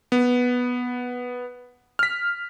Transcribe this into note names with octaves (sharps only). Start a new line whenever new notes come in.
B3
F6 B6